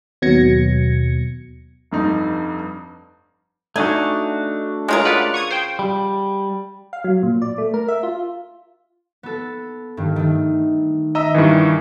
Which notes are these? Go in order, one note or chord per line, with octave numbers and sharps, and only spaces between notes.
D#2 B2 F#3 G#6 A#6 C#7
F1 G2 D#4
A3 D4 D#4 F#4 G#5
C#3 G#3 F4 A#4
B4 D5 F#5
C#6 D#6 G#6
C5 G5
G3
F5
F#3
A#2
D5
A3
A#4
E5
F4
B3 A4
G2 D#3
D#3 A3
D#5 E5 A#5 D#6 E6 B6
G2 D#3 E3